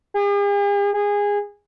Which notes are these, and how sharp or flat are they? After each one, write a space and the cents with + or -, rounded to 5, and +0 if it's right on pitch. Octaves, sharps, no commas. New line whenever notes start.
G#4 -45
G#4 -20